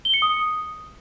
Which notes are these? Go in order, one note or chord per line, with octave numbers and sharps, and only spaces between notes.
G7
C#7
D#6